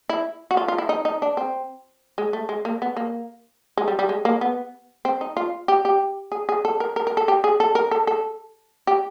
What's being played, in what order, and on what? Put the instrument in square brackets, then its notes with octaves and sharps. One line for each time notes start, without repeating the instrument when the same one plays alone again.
[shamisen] E4
F#4
F4
F4
E4
D#4
D#4
D4
C4
G#3
A3
G#3
A#3
B3
A#3
G#3
G3
G3
G#3
A#3
B3
C4
D#4
F4
G4
G4
G#4
G#4
A4
A#4
A#4
A#4
A4
G4
G#4
A4
A#4
A4
A4
G4